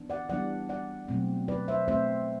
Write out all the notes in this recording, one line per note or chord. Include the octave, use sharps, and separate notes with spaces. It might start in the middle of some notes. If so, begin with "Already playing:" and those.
Already playing: E3 B3 D4
D5 F#5
E3 G3 B3 D4 D5 F#5
D5 F#5
B2 F#3 A3 C4
B4 D5
C5 E5
B2 A3 C4 C5 E5